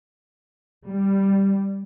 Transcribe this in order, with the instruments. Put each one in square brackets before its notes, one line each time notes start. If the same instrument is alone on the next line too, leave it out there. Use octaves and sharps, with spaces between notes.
[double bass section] G3